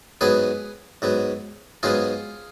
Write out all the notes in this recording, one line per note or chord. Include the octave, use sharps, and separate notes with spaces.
G#2 F#3 B3 G#4 B4
G#2 F#3 B3
G#2 F#3 B3 F4 G#4